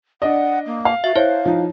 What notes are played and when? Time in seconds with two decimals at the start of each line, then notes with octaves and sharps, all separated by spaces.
0.22 D4 D5 D#5 F#5
0.66 A#3
0.85 F5
1.04 F#4 E5
1.16 E4 C5 C#5 F5
1.45 F3 D#4